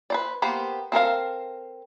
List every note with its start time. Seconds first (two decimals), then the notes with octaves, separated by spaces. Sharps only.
0.10 B4 C5 D5
0.42 A#3 B3 G4 C5
0.92 C4 A4 A#4 F5